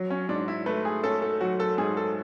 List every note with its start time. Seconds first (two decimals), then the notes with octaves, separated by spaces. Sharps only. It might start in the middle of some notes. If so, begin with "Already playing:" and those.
Already playing: F#3
0.10 C#4
0.29 G#2 D4
0.48 E4
0.66 A3 B4
0.85 G#4
1.03 C#4 A4
1.22 A4
1.41 F#3 F#4
1.60 A4
1.78 G#2 G#4
1.97 A4